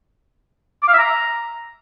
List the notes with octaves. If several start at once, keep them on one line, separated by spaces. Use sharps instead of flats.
D6
F5
E5
A#5